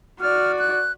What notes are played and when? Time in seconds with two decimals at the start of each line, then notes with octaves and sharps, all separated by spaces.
0.21 F#4 D5 F6
0.59 F#6